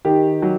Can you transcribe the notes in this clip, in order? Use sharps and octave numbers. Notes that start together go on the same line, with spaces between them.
D#3 G4
F#3